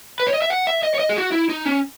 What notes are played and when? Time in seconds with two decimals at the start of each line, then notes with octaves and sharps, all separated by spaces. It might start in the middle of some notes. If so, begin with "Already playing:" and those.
0.20 B4
0.27 C#5
0.34 D#5
0.42 E5
0.50 F#5
0.67 E5
0.83 D#5
0.94 C#5
0.99 D#5
1.09 G#4
1.17 F#4
1.32 E4
1.49 D#4
1.65 C#4